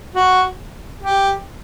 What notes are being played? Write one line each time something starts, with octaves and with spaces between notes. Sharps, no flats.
F#4
G4